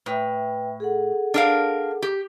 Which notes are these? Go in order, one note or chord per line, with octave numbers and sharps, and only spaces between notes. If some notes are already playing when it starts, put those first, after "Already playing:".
A2 B4 E5 G5
G#4 A4 F#5
D4 A#4 F5
G4